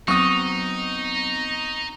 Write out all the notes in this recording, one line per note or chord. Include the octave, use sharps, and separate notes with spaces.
F#3 B3 C4 D#4 C#6 D#6